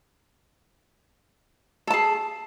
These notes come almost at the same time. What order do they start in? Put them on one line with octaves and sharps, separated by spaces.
A4 A5 G#4